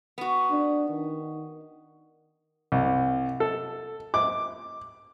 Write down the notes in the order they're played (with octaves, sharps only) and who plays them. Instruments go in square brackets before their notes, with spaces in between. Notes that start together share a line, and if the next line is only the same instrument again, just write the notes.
[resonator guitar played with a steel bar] B3 F#4
[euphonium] D4
D#3
[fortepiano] C2
A4
D6